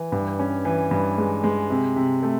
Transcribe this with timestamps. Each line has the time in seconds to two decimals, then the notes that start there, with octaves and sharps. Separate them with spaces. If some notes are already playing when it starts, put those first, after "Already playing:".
Already playing: E3
0.12 G2
0.39 C#4
0.65 E3
0.91 G2
1.18 G#3
1.43 G#3
1.70 C3
1.96 C3
2.23 A3